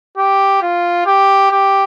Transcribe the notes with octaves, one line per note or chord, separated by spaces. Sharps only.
G4
F4
G4
G4